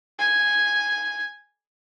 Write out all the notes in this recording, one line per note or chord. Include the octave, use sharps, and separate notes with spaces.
G#5